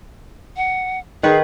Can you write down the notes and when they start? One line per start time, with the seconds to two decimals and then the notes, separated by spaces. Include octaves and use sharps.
0.57 F#5
1.23 D#3 G#4 B4